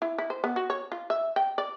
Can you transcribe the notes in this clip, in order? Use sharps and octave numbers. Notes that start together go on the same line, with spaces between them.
E4
E4
C5
B3
F#4
C#5
F4
E5
G5
D5